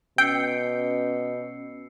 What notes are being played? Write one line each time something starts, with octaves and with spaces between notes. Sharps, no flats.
B2 C#4 G5 E6 C7 C#7